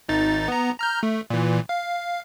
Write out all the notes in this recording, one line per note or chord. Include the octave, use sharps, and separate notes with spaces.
G#1 D#4 A6
B3 A#5
A#5 F6 G6
A3
A#2 E3
F5